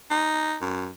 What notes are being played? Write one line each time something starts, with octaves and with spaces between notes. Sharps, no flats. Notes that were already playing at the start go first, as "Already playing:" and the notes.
D#4
F#2